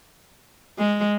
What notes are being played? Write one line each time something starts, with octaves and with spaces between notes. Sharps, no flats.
G#3